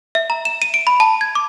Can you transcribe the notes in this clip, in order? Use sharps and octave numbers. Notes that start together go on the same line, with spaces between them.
E5
A#5
E7
D#7
D7
B5
A5
G#6
D6